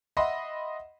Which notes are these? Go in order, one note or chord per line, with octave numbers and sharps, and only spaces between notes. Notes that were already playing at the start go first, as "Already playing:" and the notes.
D#5 E5 F#5 B5 C6